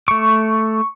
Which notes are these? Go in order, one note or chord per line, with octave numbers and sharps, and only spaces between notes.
A3 C#6 D6